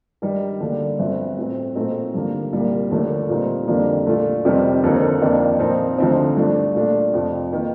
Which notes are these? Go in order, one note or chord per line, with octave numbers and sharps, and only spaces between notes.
G2 D#3 G3 D4
D2 D3 G3 A#3 D4
G1 G2 F3 C4
A2 A3 C4
A#2 A3 C4 D#4
G2 D3 G3 A#3
C2 A#2 G3 A#3
D#2 D3 F3 A3 D4
A#2 G3 C4 D#4
F2 D3 G3 A#3 D4
A#2 A3 D4 F4
F2 C3 D#3 G3 C4
D#2 D3 F3 C4 D#4
F2 D#3 A#3 D4
A#2 F3 C4 D#4
D2 D3 F3 C4 D#4
G2 F3 A3 D4
A#2 A3 D4
F2 C3 F3
D#3 A#3 D#4